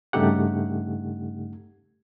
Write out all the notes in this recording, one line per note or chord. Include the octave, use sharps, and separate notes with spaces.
G2 C#3 A3 D#4 G4 F#5